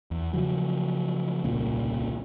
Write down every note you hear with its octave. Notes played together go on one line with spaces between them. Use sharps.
E2
C#3 F3 F#3
D#1 C2 A#2 C#3